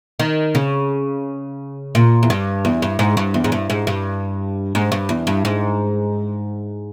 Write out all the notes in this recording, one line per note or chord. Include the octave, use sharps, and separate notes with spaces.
D#3
C#3
A#2
E2
G2
E2
G2
G#2
G2
E2
G#2
G2
G#2
G2
G#2
G2
E2
G2
G#2